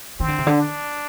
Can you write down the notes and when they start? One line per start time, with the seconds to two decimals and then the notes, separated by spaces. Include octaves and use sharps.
0.20 D#3 C4
0.28 D3
0.38 C3
0.47 D3
0.57 D4